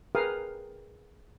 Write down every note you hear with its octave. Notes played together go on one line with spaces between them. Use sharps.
G#4 A#4 B4 F5 G5 D#6